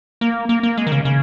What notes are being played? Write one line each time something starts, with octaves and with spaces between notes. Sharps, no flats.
A#3
A#3
A#3
G#3
D#3
C#3
C#3